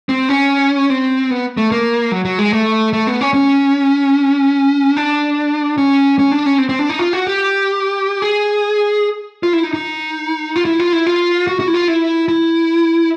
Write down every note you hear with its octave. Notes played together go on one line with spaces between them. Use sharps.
C4
C#4
C4
B3
A3
A#3
F#3
F#3
G#3
A3
A3
B3
C#4
C#4
D4
C#4
C#4
D4
C#4
C4
C4
D4
D#4
F4
F#4
G4
G#4
F4
E4
D#4
D#4
F4
E4
F4
E4
F4
F#4
F#4
E4
F4
E4
E4